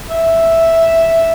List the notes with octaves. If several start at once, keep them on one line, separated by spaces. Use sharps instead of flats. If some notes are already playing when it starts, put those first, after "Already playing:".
E5